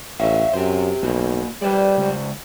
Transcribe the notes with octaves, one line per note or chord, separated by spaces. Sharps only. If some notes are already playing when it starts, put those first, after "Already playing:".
A1 C#5 E5 F5
F#2 G4 C5
B1 A#3 F#4
G3 B4 C5 D5
C#2 C5